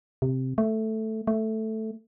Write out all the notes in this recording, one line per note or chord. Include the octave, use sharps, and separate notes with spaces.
C3
A3
A3